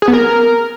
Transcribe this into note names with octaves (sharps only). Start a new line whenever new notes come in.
G#4
B3
A#4